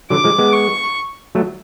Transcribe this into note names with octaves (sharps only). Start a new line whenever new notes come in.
D3 F#3 D6
F3 G#3
G#3 B3
C#6
F#3 A3